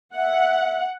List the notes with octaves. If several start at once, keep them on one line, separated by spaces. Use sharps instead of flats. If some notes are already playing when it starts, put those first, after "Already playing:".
E5 F#5